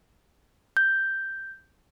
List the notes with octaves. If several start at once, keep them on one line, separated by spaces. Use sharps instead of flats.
G6